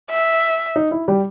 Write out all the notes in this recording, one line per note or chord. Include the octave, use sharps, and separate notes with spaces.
E5
D#4
E4
G3 G4